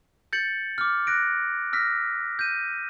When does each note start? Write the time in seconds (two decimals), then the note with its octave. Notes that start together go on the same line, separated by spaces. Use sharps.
0.33 G6 A6 C#7 F#7
0.78 D6 F6
1.07 F#6 A#6 D7
1.73 E6 F6 A#6 B6
2.39 G6 D#7